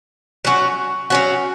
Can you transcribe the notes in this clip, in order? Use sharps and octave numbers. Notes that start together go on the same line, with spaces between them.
F#3 C#4 F#4
F#3 C#4 F#4